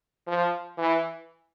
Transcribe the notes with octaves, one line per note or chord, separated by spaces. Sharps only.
F3
E3